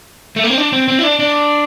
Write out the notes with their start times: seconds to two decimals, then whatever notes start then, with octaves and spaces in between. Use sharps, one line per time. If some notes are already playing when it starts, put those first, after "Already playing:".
0.36 A3
0.43 A#3
0.50 C4
0.57 D4
0.73 C4
0.88 C4
0.99 E4
1.04 D4
1.19 D4